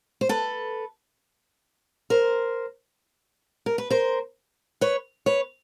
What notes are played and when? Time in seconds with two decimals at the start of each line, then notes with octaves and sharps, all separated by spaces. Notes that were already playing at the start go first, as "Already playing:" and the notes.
0.21 C5
0.29 A4 B4
2.10 A#4 C5
3.66 A#4
3.78 B4
3.90 A#4 C5
4.81 B4 C#5
5.26 B4 C#5